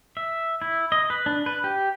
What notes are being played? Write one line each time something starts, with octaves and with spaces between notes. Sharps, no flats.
E5
E4
D#5
B4
D4
B4
G4